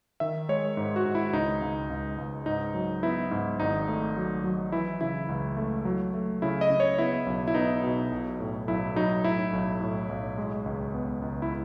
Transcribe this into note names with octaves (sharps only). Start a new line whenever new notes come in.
D#3 E5
G#3 C#5
G#2
F#4
G#2
E4
C#2 D#4
C#2
C#2
C#2
G#2 D#4
F#3
B3 E4
G#2
G#1 D#4
A3
F#3
F#3
E3 E4
C#3 E4
C#2
A3
F#3
A3
C#3 E4
D#5
C#3
C#5
B3 E4
B1
E4
B3 D#4
B2
B1
A2
B1 E4
F#3 D#4
A2 E4
B1
A2
B1
G#3
C#2
B3
C#2
E4